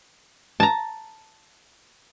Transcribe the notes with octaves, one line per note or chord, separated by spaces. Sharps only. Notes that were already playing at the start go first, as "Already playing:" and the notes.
A5 A#5